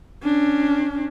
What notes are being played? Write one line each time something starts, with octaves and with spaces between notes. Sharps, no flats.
C#4 D4